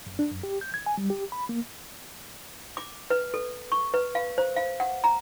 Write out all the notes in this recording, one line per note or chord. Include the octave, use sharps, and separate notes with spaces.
F#2
D4
F#2
G4
G6
G#6
G#5
G3
G4
B5
A#3
D6
B4
A4
C#6
B4
F5
C5
F5
F#5
A#5